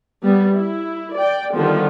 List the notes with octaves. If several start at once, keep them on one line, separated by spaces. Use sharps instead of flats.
G3 B3
E4
D5 G5
D3 D#3 F3 G3 B3